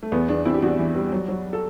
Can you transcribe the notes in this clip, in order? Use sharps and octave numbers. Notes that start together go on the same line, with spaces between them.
A3
E2 B3
E2 B3 D4
E2 C4 E4
G4
E2 D4 F#4
E3
G3
F#3
F#3
A4